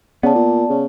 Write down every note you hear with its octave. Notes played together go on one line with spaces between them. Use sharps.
C#3 B3 D5 A5
A#2
C#3